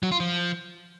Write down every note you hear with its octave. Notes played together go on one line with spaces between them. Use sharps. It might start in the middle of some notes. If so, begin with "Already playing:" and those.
F#3
F4
F3